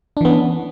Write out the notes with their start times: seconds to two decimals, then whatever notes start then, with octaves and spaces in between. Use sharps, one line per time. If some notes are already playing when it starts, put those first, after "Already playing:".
0.17 D4
0.21 E3
0.25 B3
0.29 C#4